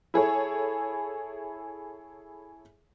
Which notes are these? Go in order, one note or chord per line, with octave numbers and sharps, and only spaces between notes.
E4 G#4 A4 C#5